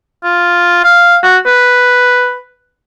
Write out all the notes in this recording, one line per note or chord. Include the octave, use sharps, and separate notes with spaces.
F4
F5
F#4
B4